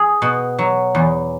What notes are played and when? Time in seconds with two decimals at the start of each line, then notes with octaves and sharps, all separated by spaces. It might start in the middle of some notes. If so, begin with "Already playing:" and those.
Already playing: G#4
0.22 B2
0.59 F#3
0.95 E2